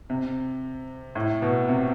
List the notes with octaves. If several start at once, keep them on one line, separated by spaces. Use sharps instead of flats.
C3
A2
B2
C3